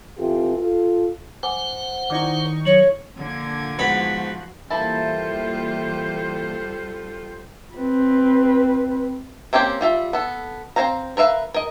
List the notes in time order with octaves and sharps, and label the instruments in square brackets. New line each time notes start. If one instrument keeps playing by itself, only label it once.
[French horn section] E3 C4 F4 G4 A4
F4 A4
[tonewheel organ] C5 F#5 [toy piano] G#5 D6
[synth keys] D#3 D#4 C#6 [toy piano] E4 D5 D6
[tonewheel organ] F#3 [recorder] C#5
[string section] A#2 D3 G#6 [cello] F3 A#3
[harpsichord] G#2 B3 B5 [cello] F3 F#4
[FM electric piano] E3 A#3 E4 [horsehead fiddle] G3 C5 [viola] F4 A4 [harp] A5
[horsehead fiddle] C4 B4
[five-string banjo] A#3 C4 C#4 G4 C5
G3 F4 E5
B3 A4
C4 D4 C5 F5 A#5
A#4 B4 E5 F5
A#4 D#5